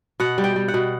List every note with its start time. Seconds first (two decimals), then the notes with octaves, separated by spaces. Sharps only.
0.20 B2 F#5
0.38 G3
0.44 G5
0.56 G3
0.68 F#5
0.74 B2